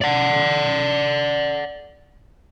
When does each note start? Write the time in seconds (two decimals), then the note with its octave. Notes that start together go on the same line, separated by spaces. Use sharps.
0.01 D5 F#5